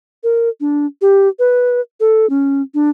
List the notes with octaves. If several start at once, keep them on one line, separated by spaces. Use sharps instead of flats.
A#4
D4
G4
B4
A4
C#4
D4